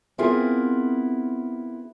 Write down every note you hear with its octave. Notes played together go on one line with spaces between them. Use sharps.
B3 C4 E4 F4 G#4 A#4